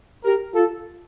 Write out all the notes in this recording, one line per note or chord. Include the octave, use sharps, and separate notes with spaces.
G4 A#4
F4 A4